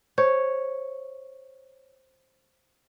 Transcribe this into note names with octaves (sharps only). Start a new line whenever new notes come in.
C5 C#5